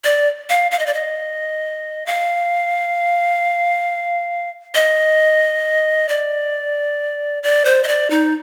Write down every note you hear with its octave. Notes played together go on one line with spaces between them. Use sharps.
D5
F5
F5
D#5
D5
D#5
F5
D#5
D5
D5
C5
D#5
D5
D#4